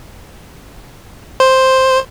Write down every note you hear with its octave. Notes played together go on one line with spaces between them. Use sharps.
C5